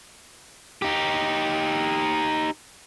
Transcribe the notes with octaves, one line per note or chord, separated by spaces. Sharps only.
D#4 G4